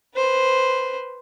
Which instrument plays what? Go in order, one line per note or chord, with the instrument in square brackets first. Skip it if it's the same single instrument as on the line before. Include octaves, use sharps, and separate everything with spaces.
[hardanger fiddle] B4 C5